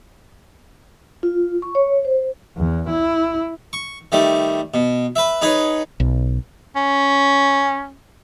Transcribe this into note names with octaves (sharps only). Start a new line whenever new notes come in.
F4
C#6
C#5
C5
E2
E4
C#6
D#3 G3 A3
B2
B4 E5
D#4 G#4 B4 C#5
B1
C#4